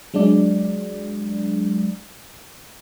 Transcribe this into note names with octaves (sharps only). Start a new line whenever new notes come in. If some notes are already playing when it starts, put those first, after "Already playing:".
F#3 G#3 D4 D5